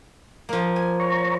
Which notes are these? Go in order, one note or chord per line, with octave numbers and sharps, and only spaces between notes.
F3 A#3
G#5
C#5 A#5 C#6